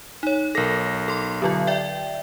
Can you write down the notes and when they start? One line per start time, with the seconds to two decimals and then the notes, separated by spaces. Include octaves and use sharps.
0.23 D#4 C#5
0.55 B1 A4 A#4 A#6
1.08 A4 C6
1.42 D3 F#3 F4
1.67 D5 E5 G5